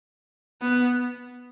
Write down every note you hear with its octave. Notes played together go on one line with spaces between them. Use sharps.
B3